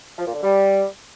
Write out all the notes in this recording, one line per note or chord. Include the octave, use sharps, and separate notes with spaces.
F3
A#2
D3
G3